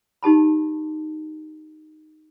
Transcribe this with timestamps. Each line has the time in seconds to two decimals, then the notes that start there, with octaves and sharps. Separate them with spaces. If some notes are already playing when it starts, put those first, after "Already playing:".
0.23 D#4 G4 A5 B5